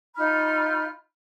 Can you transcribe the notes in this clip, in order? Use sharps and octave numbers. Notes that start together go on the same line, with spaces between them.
D#4 F4 B5 F6